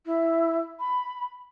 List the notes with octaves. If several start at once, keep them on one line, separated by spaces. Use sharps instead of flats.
E4
B5